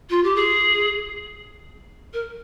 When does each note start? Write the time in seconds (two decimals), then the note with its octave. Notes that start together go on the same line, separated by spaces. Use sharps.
0.09 F4
0.23 G4
0.35 G#4
2.13 A#4